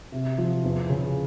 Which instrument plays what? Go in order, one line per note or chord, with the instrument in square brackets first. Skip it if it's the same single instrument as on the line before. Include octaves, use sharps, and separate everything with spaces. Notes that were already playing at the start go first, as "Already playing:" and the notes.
[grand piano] C3
F3
E2
C#3